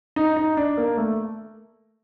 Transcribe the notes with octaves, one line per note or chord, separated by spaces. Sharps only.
D#4
D#4
D4
A#3
A3